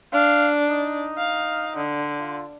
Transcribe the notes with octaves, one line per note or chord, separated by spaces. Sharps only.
D4 F5
D#4
F5
D3
F4